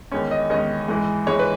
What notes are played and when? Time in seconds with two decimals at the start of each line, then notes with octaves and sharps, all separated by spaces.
0.11 E2 D#3 G#3 C#4 C#5
0.31 D#5
0.50 E2 D#3 G#3 C#4 D#5
0.88 G#2 E3 G#3
1.27 G#2 E3 G#3 C#5
1.39 B4